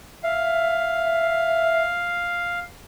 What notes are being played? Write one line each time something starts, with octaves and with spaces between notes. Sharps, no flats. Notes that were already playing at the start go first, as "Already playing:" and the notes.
E5 F5